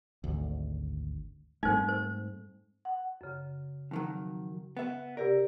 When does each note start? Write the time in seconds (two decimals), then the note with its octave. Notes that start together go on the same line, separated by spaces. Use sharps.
0.24 G#1 D2
1.63 G#2 G3 A3 C4 D#4 C5
1.88 C5
2.85 F#5
3.21 F#2 C#3
3.91 F2 D#3 F#3
4.77 B3 E5
5.17 C3 G4 A#4 D5